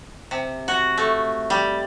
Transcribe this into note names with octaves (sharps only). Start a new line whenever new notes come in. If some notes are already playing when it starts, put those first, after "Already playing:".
C3
F#4
A3
G3